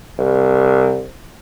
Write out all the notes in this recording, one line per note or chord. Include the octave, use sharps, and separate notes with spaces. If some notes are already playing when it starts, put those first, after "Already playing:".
C2